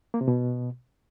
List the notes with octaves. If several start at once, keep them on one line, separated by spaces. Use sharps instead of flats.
A#3
C3
B2